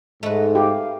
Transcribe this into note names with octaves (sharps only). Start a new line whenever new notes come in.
G#2 A3 B4 D#5
G4 F5